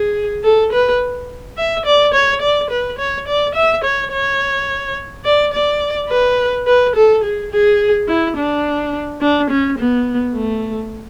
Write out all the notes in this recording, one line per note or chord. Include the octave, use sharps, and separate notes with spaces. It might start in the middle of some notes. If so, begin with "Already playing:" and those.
Already playing: G#4
A4
B4
E5
D5
C#5
D5
B4
C#5
D5
E5
C#5
C#5
D5
D5
B4
B4
A4
G#4
G#4
E4
D4
D4
C#4
B3
A3